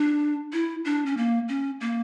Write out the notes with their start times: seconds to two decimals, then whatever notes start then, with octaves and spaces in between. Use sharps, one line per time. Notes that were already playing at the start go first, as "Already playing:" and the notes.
Already playing: D4
0.53 E4
0.85 D4
1.06 C#4
1.17 A#3
1.48 C#4
1.81 A#3